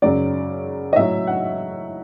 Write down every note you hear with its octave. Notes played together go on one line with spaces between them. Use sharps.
F#2 C#3 F#3 D5
D#5
A2 F#3 E5
F#5